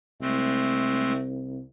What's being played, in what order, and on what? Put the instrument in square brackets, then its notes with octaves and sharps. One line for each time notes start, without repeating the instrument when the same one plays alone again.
[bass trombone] C2 [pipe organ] G#3 A3 C4